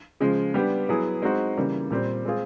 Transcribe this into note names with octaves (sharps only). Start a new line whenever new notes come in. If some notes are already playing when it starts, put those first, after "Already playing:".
C#3 F3 G#3
G3 B3 D4 G4
F#3 B3 E4 G#4
G#3 C4 D#4 F#4
C#3 E3 G3 A#3
A#2 G3 C4
G#3 C4 F4 G#4